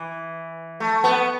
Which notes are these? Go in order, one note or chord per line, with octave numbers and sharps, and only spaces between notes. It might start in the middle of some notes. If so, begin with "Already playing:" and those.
Already playing: E3
A3
B3